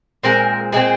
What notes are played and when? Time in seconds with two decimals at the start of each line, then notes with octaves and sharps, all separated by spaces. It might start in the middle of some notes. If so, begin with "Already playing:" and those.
0.23 A#2 G#3 C4 A#4
0.72 A#2 G#3 C4 G#4